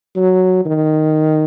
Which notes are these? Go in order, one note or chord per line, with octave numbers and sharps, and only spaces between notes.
F#3
D#3